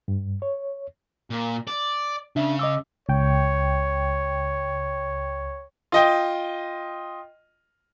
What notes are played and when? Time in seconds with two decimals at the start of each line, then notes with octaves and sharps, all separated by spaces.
0.08 G2
0.42 C#5
1.30 A#2
1.68 D5
2.36 C#3 D4 E5
2.59 D#5 D6 E6
3.09 C#2 C#5 G5
5.92 F4 D#5 G5